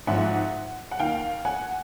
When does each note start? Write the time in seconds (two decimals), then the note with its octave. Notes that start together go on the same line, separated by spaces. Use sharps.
0.07 G#1 G#2 F3 E5 F#5
0.91 F#5
0.99 D#2 D#3 F5 G5
1.45 F#5 G#5